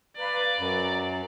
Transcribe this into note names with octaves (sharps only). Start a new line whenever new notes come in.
B4 D5 F5 A#5
F#2 A#5